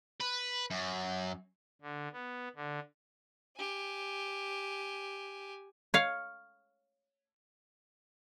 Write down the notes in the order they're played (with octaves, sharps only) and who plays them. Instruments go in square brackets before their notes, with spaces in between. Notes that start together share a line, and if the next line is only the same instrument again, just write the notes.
[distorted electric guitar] B4
F#2
[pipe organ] D3
B3
D3
[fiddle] G4 G#5
[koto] C#5 F5